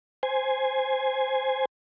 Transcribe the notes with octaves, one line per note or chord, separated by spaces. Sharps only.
C5 G#5